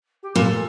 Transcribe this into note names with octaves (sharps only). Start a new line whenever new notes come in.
G4
A#2 A4